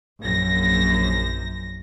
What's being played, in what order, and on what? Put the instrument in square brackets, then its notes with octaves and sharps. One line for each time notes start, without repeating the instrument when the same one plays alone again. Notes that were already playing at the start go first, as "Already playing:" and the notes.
[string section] A#1 F#2 A#6